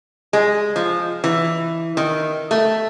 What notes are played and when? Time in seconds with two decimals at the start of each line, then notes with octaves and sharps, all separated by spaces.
0.33 G#3
0.76 F3
1.24 E3
1.97 D#3
2.51 A3